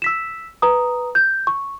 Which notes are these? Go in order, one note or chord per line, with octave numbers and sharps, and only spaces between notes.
E6 B6 E7
B4 A#5 D#6
G6
C#6